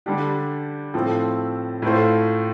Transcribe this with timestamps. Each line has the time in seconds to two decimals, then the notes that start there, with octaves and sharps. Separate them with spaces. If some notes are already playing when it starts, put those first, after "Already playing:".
0.06 D3 G3 D4 G4
0.94 A2 F3 C4 A4
1.82 A2 A3 F4 C5